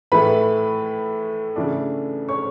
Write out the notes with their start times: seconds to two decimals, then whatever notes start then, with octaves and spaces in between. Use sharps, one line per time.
0.12 A2 E3 A3 B4 B5
1.56 C#3 E3 A3 D4
2.29 C#5 C#6